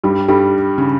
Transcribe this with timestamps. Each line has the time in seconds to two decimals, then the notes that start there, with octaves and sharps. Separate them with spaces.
0.04 G2 G3
0.28 G2 G3
0.78 C#3